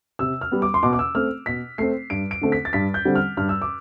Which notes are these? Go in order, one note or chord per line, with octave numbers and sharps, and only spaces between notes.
C3 E6
F6
G3 B3
D6
C6
B2 D6
D6
E6
A3 C4 F6
B2 B6
A3 C4 C7
G2 D7
D7
D3 A3 C4
B6
A6
G2 B6
G6
D3 G3 C4
F6
G2 F6
E6
D6